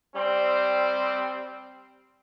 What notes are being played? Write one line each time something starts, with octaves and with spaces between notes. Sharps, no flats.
G3 C4